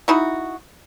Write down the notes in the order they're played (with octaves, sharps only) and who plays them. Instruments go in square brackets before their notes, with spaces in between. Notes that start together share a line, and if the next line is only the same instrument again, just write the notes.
[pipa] D#4 E4 F#4